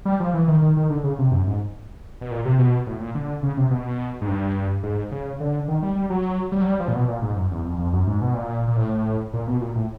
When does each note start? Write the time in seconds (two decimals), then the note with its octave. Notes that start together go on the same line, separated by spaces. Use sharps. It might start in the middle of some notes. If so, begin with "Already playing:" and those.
0.05 G3
0.20 F3
0.34 E3
0.48 D#3
0.62 D#3
0.77 D#3
0.90 D3
1.04 C#3
1.19 C3
1.32 F#2
1.47 G#2
2.21 B2
2.31 A#2
2.45 C3
2.59 B2
2.87 A2
3.00 A#2
3.15 D3
3.43 C#3
3.57 C3
3.70 B2
4.21 G#2
4.28 G2
4.83 G#2
5.12 C#3
5.40 D3
5.68 D#3
5.82 G3
5.96 G3
6.10 F#3
6.52 G3
6.61 F#3
6.66 G3
6.80 F3
6.88 A#2
6.95 B2
7.08 A#2
7.22 G#2
7.36 F#2
7.51 E2
7.65 F2
7.78 F2
7.93 F#2
8.07 G#2
8.21 B2
8.34 A#2
8.68 A#2
8.77 A2
9.33 A#2
9.47 B2
9.61 A#2
9.75 A2